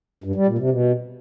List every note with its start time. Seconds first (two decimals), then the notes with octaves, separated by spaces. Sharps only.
0.24 G2
0.36 G3
0.47 A#2
0.58 C3
0.70 B2